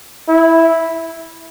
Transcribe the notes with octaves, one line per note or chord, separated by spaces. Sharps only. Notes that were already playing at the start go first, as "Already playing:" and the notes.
E4